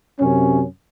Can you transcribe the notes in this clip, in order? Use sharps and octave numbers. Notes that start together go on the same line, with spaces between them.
F#2 C3 C#4